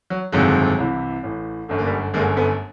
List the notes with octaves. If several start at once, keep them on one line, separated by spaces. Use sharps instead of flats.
F#3
G1 F2 C3 D#3 F#3 G#3
C2 C3 E3
A1 A2 E3
G1 F#2 D3 A3
A#3
G3 A3
G1 F#2 D3 G#3 A#3
A3 B3